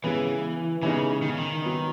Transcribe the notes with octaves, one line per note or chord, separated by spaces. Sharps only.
C#3 E3 G#3 B3
C#3 E3 G#3 B3 D#4
D#3
C#3
D#3
F#3 B3 D#4